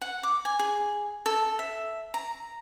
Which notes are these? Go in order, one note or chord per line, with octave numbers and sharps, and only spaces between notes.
F#5
D6
G#5
G#4
A4
E5
A#5